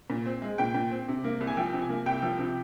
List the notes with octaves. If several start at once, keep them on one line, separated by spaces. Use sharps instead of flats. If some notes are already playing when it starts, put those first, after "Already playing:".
A#2
C4
G#3
A#2 G5
A#2
C4
C3
A#3
C2
G#5
F3 G5
C3
G#5
A#3
C2 G5
F3
C3